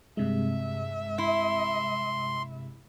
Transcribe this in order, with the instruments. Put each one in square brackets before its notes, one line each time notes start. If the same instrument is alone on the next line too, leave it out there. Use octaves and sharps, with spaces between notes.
[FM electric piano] G2 C3 G#3 [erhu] E5
[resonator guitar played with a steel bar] E4 [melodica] C6